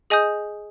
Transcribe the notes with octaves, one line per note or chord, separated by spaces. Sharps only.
G#4 D#5 G#5 D#6 G6